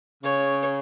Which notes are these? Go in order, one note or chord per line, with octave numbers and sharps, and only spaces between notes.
C#3 C#5